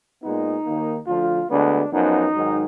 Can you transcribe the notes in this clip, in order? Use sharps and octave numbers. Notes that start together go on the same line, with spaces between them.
A#2 G#3 B3 D#4
D#2 D#3 A#3
D2 D3 F3 F4
D2 D3 G#3 B3 D4
F#2 F3 B3 D#4
G#2 D#3 F#3